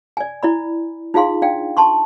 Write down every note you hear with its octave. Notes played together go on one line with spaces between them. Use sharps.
D5 G#5
E4 D5 B5
D#4 F4 G#4 F5 C6
D4 D5 F5 G5
A5 C6 C#6